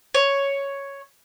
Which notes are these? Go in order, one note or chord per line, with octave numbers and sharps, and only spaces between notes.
C#5